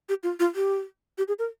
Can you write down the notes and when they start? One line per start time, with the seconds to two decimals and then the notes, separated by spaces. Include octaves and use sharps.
0.09 G4
0.23 F4
0.40 F4
0.55 G4
1.18 G4
1.28 G#4
1.39 A#4